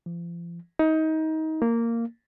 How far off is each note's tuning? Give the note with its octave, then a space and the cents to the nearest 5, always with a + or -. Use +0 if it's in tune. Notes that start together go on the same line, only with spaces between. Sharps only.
F3 -35
D#4 +25
A#3 -10